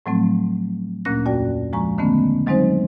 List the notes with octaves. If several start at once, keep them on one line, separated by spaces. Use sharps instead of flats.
A2 F3 F#3 A3 C4
D2 A#2 A#3 C#4 F#6 A#6
F2 F#4 D5 G5
F3 G#3 A#5 C#6
D3 D#3 A3 B3 C#4
D#3 F#3 G#3 C4 D#4 C5